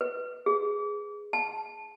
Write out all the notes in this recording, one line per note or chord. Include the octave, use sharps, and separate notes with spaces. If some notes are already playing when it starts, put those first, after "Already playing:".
B4
G#4
A5